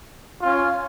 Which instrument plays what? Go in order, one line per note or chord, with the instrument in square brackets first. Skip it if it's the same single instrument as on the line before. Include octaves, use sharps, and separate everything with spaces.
[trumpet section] C#4 F4